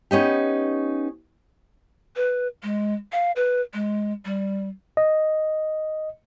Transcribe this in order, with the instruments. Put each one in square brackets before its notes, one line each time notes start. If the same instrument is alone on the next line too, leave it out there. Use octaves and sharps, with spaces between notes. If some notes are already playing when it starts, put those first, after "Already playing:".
[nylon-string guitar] B3 C#4 D#4 G4
[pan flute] B4
G#3
F5
B4
G#3
G3
[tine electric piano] D#5